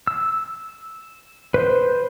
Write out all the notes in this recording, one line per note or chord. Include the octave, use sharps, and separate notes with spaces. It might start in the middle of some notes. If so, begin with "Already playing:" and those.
E6
B4 C5